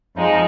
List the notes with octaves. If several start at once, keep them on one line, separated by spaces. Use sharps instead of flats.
F2 F3 G#3 D#4